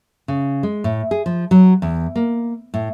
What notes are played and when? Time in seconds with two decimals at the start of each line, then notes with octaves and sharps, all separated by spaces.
0.28 C#3
0.63 G#3
0.84 A2
1.11 G#4
1.26 F3
1.51 F#3
1.82 E2
2.16 A#3
2.74 A2